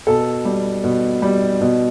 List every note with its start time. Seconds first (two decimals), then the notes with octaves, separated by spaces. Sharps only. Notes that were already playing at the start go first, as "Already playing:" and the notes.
0.07 B2 A4
0.45 G3
0.84 B2
1.22 G3
1.61 B2